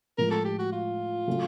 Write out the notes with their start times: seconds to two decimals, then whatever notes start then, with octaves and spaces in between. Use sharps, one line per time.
0.18 A2 F3 G#3 A#4
0.31 A4
0.45 G4
0.59 F#4
0.73 F4
1.28 C#3 F#3 A3 C#4